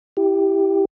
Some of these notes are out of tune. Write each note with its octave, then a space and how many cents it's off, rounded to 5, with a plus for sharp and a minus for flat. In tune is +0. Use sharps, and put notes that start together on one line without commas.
E4 +0 G4 +0